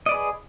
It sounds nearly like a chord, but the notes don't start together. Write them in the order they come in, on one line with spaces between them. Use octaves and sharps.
D#5 D5 B4 G#4